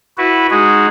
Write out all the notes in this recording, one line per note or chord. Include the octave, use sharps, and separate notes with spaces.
E4 F#4 B4
G#3 D#4 F#4 G#4